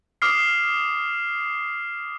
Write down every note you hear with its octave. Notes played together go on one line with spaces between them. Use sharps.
D6 D#6 F6 C7